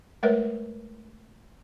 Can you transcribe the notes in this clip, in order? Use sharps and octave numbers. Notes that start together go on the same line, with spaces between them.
G#3 A3 A#4 B4 C#5 E5